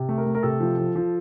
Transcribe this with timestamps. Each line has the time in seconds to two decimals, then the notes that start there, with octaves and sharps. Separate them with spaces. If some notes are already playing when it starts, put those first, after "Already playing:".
Already playing: C3
0.09 A3
0.18 A#4
0.26 A3
0.35 A#4
0.43 C3 A4
0.60 F3
0.78 F3
0.96 F3